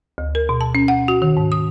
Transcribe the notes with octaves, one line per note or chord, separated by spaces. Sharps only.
D2
A#4
B2
A5
C#4
F#5
F#4
D#3
G#2
D#6